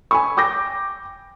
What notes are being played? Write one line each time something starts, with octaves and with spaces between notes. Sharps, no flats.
G#5 B5 C#6
G5 D6 G6 A#6